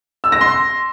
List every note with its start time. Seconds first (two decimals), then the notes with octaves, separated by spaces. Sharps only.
0.24 E6
0.32 A#6
0.41 C6